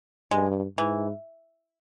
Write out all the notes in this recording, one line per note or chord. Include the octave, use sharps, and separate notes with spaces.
G2 G#3
G#2 E3